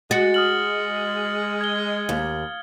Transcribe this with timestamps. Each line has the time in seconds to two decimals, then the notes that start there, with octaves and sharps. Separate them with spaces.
0.11 G#3 F#4 A6 C#7
0.34 D#6 F6 F#7
1.61 G#6 G7
2.09 D#2